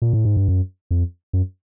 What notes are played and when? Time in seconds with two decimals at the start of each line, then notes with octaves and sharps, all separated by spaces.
0.02 A#2
0.13 A2
0.25 G#2
0.37 G2
0.48 F#2
0.91 F2
1.33 F#2